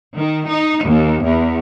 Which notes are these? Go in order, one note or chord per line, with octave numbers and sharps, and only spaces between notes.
D#3
D#4
D#2
E2